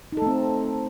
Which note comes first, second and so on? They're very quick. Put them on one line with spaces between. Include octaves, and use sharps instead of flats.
D#4 A4 A3 C4